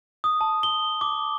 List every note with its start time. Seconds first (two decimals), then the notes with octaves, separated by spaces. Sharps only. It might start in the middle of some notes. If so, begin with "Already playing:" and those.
0.24 D#6
0.41 A5
0.63 G7
1.01 D6